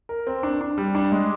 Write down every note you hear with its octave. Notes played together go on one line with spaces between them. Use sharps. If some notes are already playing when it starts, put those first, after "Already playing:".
A#4
C4
D4
D4
G3
D4
G#3